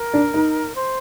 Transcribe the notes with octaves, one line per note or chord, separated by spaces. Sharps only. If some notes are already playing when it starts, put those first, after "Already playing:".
Already playing: A#4
D4
D#4
C5